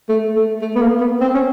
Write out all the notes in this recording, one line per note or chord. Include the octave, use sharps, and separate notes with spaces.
A3
A3
A3
B3
A#3
B3
C4
C#4